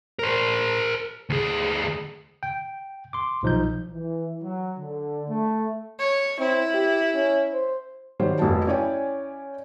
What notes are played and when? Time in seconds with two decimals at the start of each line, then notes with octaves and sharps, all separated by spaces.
0.19 A#4 C5
1.30 D2 G#4
2.43 G5
3.13 C6 D6
3.43 B1 F3 D#4 G6
3.92 E3
4.42 F#3
4.78 D3
5.29 A3
5.99 C#5
6.39 C4 E4
6.74 G4
7.14 C#4
7.53 C5
8.20 D#3 F#3 G3 C5 C#5
8.39 F1 F2 F#4 A5
8.67 C#4 E4 C#5 D5 G5 G#5